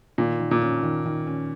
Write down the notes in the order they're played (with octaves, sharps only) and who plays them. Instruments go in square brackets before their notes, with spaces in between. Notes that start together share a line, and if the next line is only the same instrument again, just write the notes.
[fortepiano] A#2 [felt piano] D#3
[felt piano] D#3
[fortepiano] A#2
[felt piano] C#4
D#3
D#3
C#4